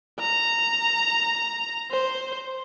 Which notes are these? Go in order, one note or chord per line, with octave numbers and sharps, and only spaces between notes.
A#5
C5